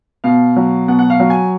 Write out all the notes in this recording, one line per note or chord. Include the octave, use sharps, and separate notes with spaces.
B2 F5
F#3
B2 F#5
F#5
F5
F#3
G#5